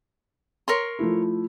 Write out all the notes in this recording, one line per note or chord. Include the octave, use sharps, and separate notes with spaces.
A#4 C#5 C6
F3 A3 E4